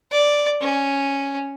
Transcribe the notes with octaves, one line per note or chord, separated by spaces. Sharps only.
D5
C#4